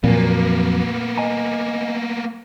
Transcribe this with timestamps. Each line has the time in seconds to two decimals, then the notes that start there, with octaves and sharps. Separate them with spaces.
0.04 F2 A#2 F#3 A#3 B3
1.18 D#5 G#5 A#5